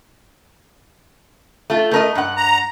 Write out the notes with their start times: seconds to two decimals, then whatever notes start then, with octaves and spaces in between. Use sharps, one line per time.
1.70 A3 F4
1.91 A3 A#4 D#5
2.15 G2 F#5
2.37 A#5